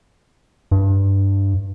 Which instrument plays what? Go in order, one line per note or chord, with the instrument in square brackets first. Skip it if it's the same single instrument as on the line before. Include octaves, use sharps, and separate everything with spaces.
[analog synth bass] G2